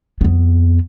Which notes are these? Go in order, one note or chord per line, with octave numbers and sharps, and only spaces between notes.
F2 B3